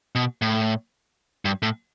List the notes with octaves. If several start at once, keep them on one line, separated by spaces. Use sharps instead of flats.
B2
A2
G2
A2